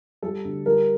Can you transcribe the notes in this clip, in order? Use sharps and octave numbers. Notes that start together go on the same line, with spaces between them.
G3 A4
D2
G3 A#4